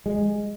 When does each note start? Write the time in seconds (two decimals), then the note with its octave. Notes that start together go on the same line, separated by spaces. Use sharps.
0.06 G#3